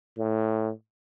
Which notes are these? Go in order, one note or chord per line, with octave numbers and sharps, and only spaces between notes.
A2